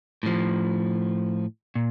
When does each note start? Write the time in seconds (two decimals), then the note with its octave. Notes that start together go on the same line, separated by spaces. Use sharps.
0.23 A2 F3
1.75 A#2